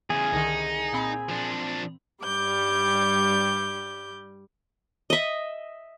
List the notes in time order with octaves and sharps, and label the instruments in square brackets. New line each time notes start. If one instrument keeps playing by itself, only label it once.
[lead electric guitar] E2 C#3 [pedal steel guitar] G#4
[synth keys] C2 D3 D#3 [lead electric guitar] D#4
[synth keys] A#2 C4 B5
[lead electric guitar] F3 D4
[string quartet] G2 G3 D6 G6
[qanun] D#5 E5